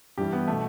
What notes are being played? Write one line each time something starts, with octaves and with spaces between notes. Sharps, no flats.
G2 E3 G3 G4
B3
B2 A3